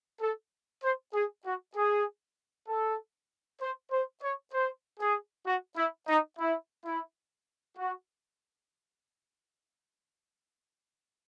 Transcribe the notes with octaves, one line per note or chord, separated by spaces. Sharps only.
A4
C5
G#4
F#4
G#4
A4
C5
C5
C#5
C5
G#4
F#4
E4
D#4
E4
E4
F#4